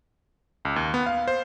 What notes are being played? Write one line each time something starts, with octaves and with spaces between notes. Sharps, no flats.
C#2
D#2
B3
F5
C5